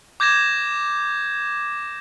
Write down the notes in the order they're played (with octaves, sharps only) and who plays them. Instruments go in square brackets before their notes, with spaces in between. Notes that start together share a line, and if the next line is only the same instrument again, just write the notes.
[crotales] D6 G6 G#6 A#6 E7